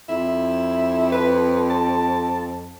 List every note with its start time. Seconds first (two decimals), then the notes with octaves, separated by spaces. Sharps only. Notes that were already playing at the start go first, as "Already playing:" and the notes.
0.09 F2 E4
1.12 B4
1.70 A5